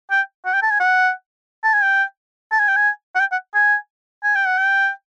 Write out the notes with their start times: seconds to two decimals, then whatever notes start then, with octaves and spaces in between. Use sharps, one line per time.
0.11 G5
0.45 F#5
0.54 G5
0.63 A5
0.71 G#5
0.80 F#5
1.64 A5
1.74 G#5
1.83 G5
2.52 A5
2.60 G#5
2.68 G5
2.76 G#5
3.15 F#5
3.20 G5
3.32 F#5
3.54 G#5
4.23 G#5
4.35 G5
4.46 F#5
4.58 G5